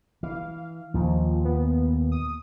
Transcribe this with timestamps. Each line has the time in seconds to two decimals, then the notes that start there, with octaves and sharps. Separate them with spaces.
0.23 E3 F5
0.94 D#2 A#2 F3
1.45 B3
2.12 D#6